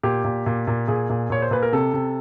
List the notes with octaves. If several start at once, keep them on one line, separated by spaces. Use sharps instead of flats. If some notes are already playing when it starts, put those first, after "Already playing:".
A#2 G4
A#2
A#2
A#2
A#2 G#4
A#2
A#2 C#5
C5
A#2 B4
A#4
C3 A4
C3